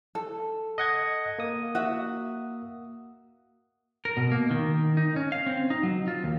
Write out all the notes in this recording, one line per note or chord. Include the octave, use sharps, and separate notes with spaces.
A4
D#5 F#5 G#6
A#3 D#6
F#4 E5
A#4
B2
A#3
D#3
D#4
C#4
F5
C4
D#4
F#3
F4
D#2